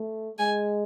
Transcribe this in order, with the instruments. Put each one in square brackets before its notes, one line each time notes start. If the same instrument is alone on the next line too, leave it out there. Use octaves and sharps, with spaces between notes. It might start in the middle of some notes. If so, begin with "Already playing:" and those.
Already playing: [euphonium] A3
[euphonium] G#3 [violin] G#5